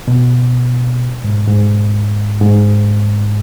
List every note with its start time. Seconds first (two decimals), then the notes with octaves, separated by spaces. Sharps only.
0.08 B2
1.24 G#2
1.47 G#2
2.41 G#2